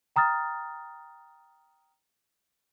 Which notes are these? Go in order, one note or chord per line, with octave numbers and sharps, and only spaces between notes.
G5 A#5 D#6 F6 A6